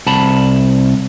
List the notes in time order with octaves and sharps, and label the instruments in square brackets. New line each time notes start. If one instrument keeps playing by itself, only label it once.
[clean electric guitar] C2 A5 B5